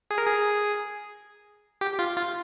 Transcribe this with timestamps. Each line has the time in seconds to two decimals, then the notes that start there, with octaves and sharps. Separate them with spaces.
0.11 G#4
0.18 A#4
0.26 G#4
1.81 G4
1.99 F4
2.17 F4